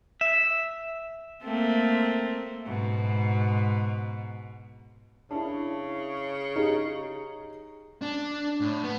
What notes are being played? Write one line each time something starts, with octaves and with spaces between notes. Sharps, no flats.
E5
A3 A#3 C4
G#2 B2
C#3 D4 E4
D#4 G4 G#4
D4
A2
B3